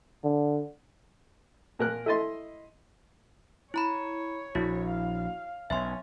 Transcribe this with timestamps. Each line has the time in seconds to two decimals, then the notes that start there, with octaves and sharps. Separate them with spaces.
0.24 D3
1.79 A#2 A#4 F#6
2.06 E4 A4 D#5 C6 A6
3.74 E4 C#5 A#5 B5
4.55 A#1 E4 F#4
4.89 F5
5.70 B1 C#4 E5 C6